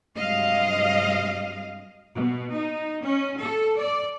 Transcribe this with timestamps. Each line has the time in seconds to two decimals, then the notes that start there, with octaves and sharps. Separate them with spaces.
0.18 G2 C3 F#3 G#3 D#5 F5
2.16 B2
2.53 D#4
3.02 C#4
3.39 A4
3.77 D5